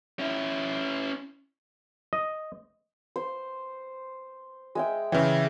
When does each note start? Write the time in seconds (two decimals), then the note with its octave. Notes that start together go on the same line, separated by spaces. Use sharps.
0.19 C#4 E4
2.13 D#5
3.16 C5
4.75 G#3 E5 G5
5.12 C#3 E3 E5 G5